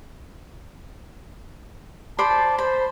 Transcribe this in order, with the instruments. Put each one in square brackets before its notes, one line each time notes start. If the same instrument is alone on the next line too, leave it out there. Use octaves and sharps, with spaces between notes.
[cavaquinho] C5 D5 B5 [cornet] A5
[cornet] C5 [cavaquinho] B5